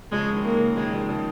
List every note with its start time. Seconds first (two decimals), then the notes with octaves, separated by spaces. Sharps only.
0.12 C#3 F3 G#3
0.33 D#3
0.44 A#3
0.55 C#3
0.76 D#3 G#3
0.93 C#3 F3
1.09 C#3 F3